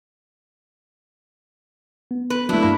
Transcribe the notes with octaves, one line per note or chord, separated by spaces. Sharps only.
B3
B4
F#3 A3 D4 E4
G2 A#3 B5